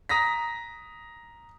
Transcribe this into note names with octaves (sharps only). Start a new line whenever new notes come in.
A#5 D#6 A#6 B6